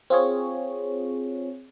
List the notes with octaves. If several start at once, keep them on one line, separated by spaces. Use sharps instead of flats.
C4 F4 G#4 C#5